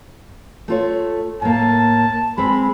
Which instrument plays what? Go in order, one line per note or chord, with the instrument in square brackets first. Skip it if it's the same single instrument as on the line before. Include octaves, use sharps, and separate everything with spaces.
[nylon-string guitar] A3 F4 C#5
[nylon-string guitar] A2 A#3 [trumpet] A5
[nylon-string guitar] G#3 C4 [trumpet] B5